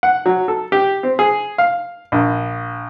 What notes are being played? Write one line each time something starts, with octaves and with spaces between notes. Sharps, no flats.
F#5
F#3
A4
G4
C4
G#4
F5
A#1